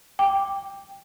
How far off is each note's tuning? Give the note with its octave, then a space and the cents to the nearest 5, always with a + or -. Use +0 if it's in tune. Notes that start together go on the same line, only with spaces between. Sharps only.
G5 +15 D6 +0